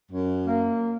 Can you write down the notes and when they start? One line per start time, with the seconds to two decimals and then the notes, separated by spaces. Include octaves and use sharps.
0.11 F#2
0.46 A#3